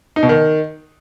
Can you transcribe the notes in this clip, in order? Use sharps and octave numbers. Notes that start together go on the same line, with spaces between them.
D#4
B2
D#3